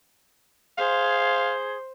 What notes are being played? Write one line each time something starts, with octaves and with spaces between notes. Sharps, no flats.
G#4 C5 F5